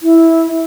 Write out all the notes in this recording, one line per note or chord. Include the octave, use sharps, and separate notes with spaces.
E4